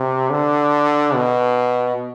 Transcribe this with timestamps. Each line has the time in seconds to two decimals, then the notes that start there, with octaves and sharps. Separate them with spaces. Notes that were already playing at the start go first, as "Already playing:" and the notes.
Already playing: C3
0.30 D3
1.14 B2